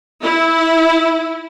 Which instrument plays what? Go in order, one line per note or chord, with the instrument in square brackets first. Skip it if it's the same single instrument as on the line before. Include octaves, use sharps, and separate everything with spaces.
[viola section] E4